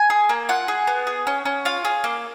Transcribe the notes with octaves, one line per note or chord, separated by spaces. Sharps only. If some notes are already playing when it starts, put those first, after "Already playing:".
Already playing: G#5
G#4
A#3
F4 F#5
G#4
B3
G#4
C#4
C#4
F4 F5
G#4
A#3